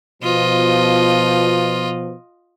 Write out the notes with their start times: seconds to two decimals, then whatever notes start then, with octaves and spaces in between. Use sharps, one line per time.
0.23 B2 F3 F4 D#5